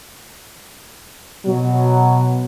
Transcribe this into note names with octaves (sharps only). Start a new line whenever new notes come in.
B2 F#3